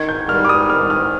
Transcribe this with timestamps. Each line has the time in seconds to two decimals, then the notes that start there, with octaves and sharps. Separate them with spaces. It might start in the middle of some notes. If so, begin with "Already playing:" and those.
Already playing: D#3 G#6
0.08 G#2 G6
0.28 G3 F6
0.45 D6
0.49 G#2 D#6
0.69 D#3 F6
0.90 G#2 F6